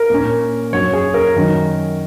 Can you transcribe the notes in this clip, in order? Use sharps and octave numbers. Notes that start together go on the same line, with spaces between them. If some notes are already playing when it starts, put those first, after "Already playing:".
Already playing: A#4
A#2 A#3 C#4
F#2 F#3 C#4 C#5
G#4
A#4
F#2 D#3 F#3 C#4